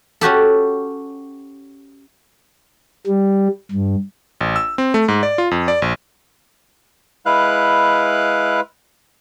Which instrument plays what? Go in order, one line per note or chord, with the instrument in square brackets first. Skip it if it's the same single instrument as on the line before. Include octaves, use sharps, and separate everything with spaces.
[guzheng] C#4 F#4 G4 A4
[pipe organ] G3
G2
[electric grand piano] A1
E6
C4
A3
G#2
D5
F4
F2
D5
A#1
[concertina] G#3 E4 B4 F5 F#6